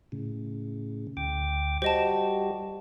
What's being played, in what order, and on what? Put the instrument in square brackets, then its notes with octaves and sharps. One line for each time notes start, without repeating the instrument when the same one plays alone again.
[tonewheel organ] A2 C#3
D2 G5 D6
[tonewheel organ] G3 F#4 G4 [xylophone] C5 D#5 A5